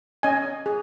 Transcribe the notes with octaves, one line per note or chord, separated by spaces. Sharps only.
C#4 D#5 G#5
G#4